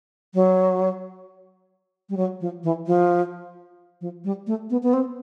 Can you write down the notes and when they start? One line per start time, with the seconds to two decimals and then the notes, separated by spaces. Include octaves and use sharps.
0.34 F#3
2.09 G3
2.17 F#3
2.41 F3
2.64 E3
2.87 F3
4.01 F3
4.24 G3
4.47 A3
4.70 B3
4.83 B3
4.93 C4